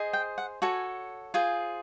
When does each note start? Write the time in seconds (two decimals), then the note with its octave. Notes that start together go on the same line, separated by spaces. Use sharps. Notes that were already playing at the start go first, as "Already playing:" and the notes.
Already playing: G#4 C5 D#5
0.13 G5
0.38 F#5
0.62 F#4 A4 C#5 G#5
1.34 F4 G#4 C5 G#5